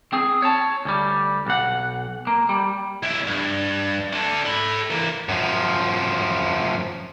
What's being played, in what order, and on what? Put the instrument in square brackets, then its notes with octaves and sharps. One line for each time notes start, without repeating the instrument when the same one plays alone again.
[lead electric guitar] C4 G#4
C#5 A5
D2 G3
B1 F#5
A#3
G3
[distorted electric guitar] B1 E4
G2
A3 D4
A4 B5
E3 A#3
[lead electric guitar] F#2 F3